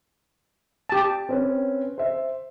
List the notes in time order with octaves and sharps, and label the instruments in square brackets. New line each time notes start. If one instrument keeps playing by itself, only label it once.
[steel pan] G4 A5
[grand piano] C4 C#4 B4
C5 E5